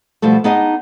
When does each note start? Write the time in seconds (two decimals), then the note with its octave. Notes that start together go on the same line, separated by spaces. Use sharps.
0.22 B2 F3 G3 A3
0.44 B3 D4 D#4 G#4 D#5